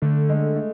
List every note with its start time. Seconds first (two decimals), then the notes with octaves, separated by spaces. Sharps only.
0.02 D3 A3
0.29 G#3
0.56 A3